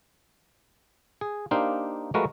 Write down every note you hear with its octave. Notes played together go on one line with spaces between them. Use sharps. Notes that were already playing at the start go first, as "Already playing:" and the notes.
G#4
A#3 D4 D#4 G4 C5 F5
F3 G#3 A3 F#4 A#4 B4